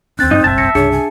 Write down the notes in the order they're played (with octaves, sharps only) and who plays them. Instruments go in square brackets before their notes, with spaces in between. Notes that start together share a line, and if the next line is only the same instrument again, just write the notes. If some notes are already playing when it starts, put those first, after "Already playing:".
[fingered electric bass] D#2 D4 [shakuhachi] C4 [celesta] F#6 A6
[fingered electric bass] G2 F#3 A#3 [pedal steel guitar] D#4
[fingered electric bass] F#1 B1 G2 [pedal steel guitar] E5 A5
[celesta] A#6 C#7
[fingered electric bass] C2 G2 C#3 [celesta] D4 G#4 C#7 [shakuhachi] C#5
[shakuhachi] G#5